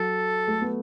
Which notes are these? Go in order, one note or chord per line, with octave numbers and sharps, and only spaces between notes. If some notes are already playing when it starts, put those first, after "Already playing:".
Already playing: F#3 A4
A3
B3